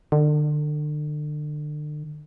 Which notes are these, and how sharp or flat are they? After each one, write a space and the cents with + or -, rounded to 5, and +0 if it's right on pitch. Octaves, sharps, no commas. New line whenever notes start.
D3 +35